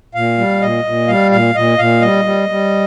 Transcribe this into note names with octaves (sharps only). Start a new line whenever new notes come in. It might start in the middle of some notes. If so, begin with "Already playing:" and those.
A#2 F5
G3
A#2 D#5
A#2
G3 F5
A#2 F5
A#2 D#5
A#2 F5
G3 D#5
G3
G3